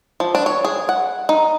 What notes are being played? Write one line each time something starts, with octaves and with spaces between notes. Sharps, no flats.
F3
D4
C#5
G#4
F#5
D#4